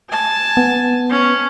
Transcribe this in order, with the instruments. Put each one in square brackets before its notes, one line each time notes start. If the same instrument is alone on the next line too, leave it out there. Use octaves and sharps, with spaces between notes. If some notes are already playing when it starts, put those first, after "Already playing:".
[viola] G#5 A5
[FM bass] B3
[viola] C#4